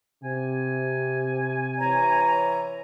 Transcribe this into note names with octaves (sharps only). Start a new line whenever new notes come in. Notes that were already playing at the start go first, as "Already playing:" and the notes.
C3 G#5
E3 C#5 A#5